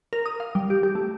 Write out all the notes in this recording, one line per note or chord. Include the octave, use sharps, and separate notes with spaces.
A#4
D#6
F5
G3
G4
G4
A3